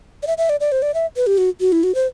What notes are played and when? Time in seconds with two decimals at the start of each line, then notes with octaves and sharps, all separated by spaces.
0.23 D5
0.27 E5
0.38 E5
0.49 D5
0.60 D5
0.72 C5
0.82 D5
0.94 E5
1.17 B4
1.27 G4
1.38 F#4
1.60 F#4
1.72 E4
1.84 F#4
1.95 C5